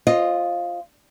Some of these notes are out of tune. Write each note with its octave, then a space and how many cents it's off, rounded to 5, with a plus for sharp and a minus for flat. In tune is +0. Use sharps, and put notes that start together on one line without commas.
F4 +0 C5 +30 D#5 +0